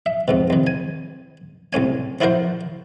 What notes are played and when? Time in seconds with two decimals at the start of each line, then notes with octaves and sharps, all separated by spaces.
0.06 E5
0.28 F2 G#2 B2
0.50 C2 D#3
0.67 G#5
1.73 C2 A2 C#4 G#5
2.21 F3 E4 F#4 A#4 C5